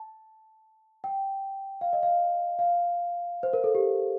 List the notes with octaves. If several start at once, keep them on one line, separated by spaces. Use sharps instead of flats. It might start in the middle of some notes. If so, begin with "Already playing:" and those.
Already playing: A5
G5
F5
D#5
F5
F5
C5
A#4
A4
G4